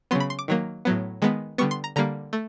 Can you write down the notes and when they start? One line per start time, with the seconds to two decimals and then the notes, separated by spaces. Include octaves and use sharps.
0.11 C#3 F#3 B3 C6
0.20 B5
0.30 C6
0.39 D6
0.48 D#3 F#3 A#3
0.85 A2 F#3 B3
1.22 D#3 G#3 B3
1.58 D3 G3 B3 C#6
1.71 C6
1.84 A#5
1.96 D3 G3 A#3 A#5
2.33 A3